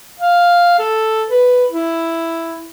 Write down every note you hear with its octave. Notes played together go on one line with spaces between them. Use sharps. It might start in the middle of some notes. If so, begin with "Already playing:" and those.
F5
A4
B4
E4